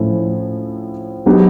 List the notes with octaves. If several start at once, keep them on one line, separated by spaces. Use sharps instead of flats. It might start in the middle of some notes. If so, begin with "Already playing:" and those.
Already playing: A2 F3 A3 C#4 E4
F#3 B3 D#4 G4